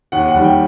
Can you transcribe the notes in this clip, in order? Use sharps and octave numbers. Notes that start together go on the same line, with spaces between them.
D#2 F#5
F#5
D#3 G3
G5